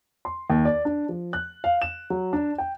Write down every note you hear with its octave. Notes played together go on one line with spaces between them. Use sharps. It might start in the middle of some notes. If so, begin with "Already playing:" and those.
C6
D#2
D5
D4
F3
F#6
F5
E7
F#3
D4
G5